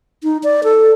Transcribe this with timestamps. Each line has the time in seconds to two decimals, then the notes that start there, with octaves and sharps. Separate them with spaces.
0.23 D#4
0.44 D5
0.64 A4